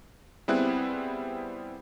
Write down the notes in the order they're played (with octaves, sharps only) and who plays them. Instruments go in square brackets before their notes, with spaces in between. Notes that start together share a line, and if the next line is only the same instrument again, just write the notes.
[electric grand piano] G3 B3 C4 E4 G#4 F#6